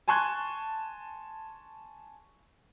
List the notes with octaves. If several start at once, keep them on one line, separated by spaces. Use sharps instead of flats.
G#5 A5 C6 C#6 F#6 G#6